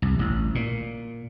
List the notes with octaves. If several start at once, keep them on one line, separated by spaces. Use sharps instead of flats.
C2
A1
A#2